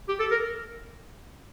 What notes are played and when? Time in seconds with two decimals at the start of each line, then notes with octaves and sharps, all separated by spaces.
0.09 G4
0.20 A4
0.31 A#4